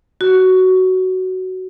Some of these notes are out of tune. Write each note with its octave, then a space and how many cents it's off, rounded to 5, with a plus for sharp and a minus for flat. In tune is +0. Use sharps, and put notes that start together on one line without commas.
F#4 +10